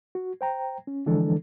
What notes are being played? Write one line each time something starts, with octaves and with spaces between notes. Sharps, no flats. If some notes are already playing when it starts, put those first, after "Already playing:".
F#4
C5 G5 A#5
C#4
D3 E3 F3 G#3 D4 A4